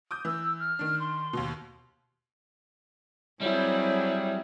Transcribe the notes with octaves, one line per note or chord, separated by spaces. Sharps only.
D6 D#6 G6
E3 E6
F6
D#3 D4
C6
D#2 B2
F#3 G3 C4 E4 G#4 C#5